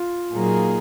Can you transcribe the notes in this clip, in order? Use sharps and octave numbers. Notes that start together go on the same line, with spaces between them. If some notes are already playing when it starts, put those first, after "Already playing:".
Already playing: F4
A#2 F#3 A#3 D#4 G#4